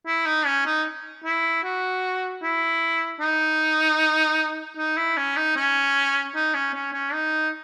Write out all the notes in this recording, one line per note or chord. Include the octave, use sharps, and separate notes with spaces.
E4
D#4
C#4
D#4
E4
F#4
E4
D#4
D#4
E4
C#4
D#4
C#4
D#4
C#4
C#4
C#4
D#4